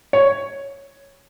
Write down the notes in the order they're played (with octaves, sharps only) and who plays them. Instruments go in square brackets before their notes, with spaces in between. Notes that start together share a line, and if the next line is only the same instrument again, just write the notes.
[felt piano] C#5